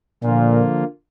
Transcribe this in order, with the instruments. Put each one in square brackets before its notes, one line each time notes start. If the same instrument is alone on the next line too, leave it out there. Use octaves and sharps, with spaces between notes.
[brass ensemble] A#2 [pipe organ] D3 F3 A#3 F4